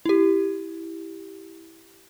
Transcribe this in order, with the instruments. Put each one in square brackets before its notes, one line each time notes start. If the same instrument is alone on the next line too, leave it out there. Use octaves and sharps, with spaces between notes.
[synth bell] E4 G4